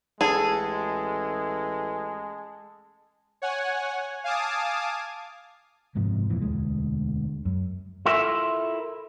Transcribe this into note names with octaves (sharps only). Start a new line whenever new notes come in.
A1 G#3 G#4 A4
C#5 F#5 G#5
F5 G#5 A5 D6 D#6
F#1 G#2 C3 F3
F2 A#2 E3
E1 D2 G#3
F#2
E4 F4 A4 A#4 E5